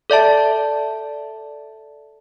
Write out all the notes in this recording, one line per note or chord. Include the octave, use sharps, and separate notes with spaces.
A4 D5 E5 A5